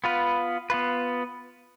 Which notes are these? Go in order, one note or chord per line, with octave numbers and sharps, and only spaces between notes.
B3 F4 B4
B3 F4 B4